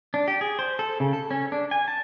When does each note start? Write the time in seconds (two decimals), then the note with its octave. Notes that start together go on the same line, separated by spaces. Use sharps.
0.14 D4
0.28 G4
0.41 G#4
0.59 C5
0.79 A4
1.00 C#3
1.13 A4
1.31 C#4
1.52 D4
1.71 G#5
1.88 A5